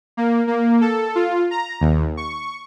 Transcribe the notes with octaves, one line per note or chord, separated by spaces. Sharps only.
A#3
A#3
A4
F4
A#5
D#2
C#6